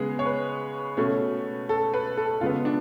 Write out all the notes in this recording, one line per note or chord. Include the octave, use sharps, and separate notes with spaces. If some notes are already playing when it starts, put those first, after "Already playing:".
Already playing: C#3 G#3 B3 G#4
C#5
B4
B2 A3 C#4
A4
B4
A4
C#3 G#3 B3 F4
D4